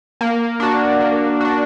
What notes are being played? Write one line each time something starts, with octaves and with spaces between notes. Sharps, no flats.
A#3
D4 F#4
A#3
D4 F#4